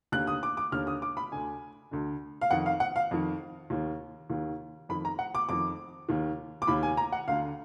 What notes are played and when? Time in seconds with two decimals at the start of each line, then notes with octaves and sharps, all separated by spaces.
0.12 D#2 D3 F#6
0.27 D#6
0.43 D6
0.57 D6
0.72 D#2 D3 F6
0.87 D#6
1.02 D6
1.17 B5
1.31 D2 D3 G#5
1.91 D2 D3
2.41 F5
2.51 F2 D#3 F#5
2.66 F5
2.80 F#5
2.96 F5
3.11 F2 D#3
3.70 D#2 D#3
4.30 D#2 D#3
4.89 F2 D#3 B5
5.05 A#5
5.19 F#5
5.35 D6
5.49 F2 D#3 D6
6.09 D#2 D#3
6.62 D6
6.67 D#2 D#3 B5
6.83 G#5
6.97 A#5
7.12 F#5
7.28 D2 D3 F5